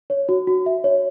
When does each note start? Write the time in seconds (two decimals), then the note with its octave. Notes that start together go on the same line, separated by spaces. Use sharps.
0.10 C#5
0.29 F#4
0.47 F#4
0.66 E5
0.84 C#5